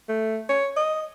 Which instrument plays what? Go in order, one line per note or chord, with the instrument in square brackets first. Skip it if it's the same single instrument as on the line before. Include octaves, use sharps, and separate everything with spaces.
[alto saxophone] A3
C#5
D#5